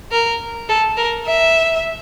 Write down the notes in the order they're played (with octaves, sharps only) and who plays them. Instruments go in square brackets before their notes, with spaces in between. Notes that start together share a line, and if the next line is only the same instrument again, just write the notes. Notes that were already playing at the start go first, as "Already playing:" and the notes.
[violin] A#4
A4
A#4
E5